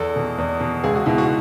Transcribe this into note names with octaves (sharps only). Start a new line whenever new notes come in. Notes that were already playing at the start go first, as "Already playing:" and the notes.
Already playing: E2 A4
B2
E2
B2
C#2 G#4
F#4
B2 E4
F#4